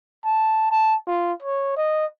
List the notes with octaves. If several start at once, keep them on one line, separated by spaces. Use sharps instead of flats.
A5
A5
F4
C#5
D#5